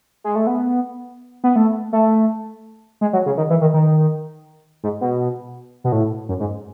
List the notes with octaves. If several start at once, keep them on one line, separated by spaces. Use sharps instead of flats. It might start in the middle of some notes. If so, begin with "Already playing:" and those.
G#3
A3
B3
B3
A3
A3
G#3
F#3
C#3
D#3
E3
D#3
D#3
G#2
B2
B2
A2
F#2
G#2